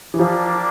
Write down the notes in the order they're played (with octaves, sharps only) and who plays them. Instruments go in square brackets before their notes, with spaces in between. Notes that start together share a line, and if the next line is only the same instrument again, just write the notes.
[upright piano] E3
[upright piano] F3 [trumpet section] G3 A#3 D4